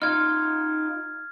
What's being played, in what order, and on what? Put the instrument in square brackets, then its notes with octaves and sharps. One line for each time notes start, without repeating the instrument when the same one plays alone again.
[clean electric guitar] D#4 F4 [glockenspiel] F6 G#6